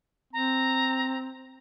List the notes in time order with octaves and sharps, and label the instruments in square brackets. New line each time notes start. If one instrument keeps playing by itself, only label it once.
[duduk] C4 [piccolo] A#5